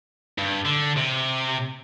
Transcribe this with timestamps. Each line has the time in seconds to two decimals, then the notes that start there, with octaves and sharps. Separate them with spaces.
0.38 G2
0.65 D3
0.97 C3